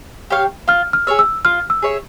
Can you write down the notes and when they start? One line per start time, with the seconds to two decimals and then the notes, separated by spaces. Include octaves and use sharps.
0.30 G4 C#5 F5
0.68 F4 F6
0.93 F6
1.07 G#4 C#5 E5
1.19 E6
1.45 F4 F6
1.70 E6
1.82 G#4 C#5 E5